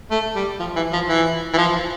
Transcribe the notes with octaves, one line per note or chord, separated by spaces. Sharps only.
A3
G3
F3
E3
F3
E3
E3
F3